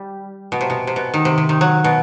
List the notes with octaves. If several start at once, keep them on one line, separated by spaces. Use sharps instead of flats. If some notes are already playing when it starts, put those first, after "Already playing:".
Already playing: G3
B2
C3
B2
C3
B2
D#3
C3
C3
D#3
F#3
B2